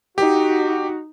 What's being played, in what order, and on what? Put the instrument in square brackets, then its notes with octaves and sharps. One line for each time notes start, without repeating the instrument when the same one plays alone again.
[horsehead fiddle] D#4 [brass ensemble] F#4 [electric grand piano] G4